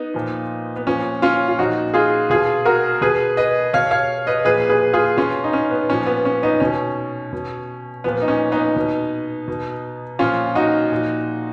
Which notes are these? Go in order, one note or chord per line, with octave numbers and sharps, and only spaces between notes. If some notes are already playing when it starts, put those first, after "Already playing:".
Already playing: B3 D#4
A#2 F3
B3
A#2 F3 C#4
C#4 F4
F4
A#2 F3 D#4 F#4
F4 G#4
B2 F4 G#4
F#4 A#4
B2 G#4 B4
B4 D#5
B2 C#5 F5
C#5 F5
B4 D#5
A#2 F3 G#4 B4
G#4 B4
F4 G#4
B2 C#4 F4
D#4
C#4
B3
A#2 F3 C#4
B3
C#4
B3 D#4
B2 C#4
B2
A#2 F3 B3
D#4
C#4
B3 D#4
B2
B2
A#2 F3 C#4 F4
D#4 F#4
A#2 F3